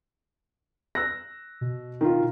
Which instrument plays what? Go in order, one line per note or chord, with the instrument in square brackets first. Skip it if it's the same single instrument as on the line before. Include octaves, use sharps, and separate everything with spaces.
[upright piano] E6 F#6 A#6
[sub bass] B2
[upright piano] D#3 F4